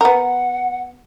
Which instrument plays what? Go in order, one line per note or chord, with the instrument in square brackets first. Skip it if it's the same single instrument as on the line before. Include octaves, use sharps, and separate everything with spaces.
[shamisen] B3 A#4 [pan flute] F#5